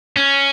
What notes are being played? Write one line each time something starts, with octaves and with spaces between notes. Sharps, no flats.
C#4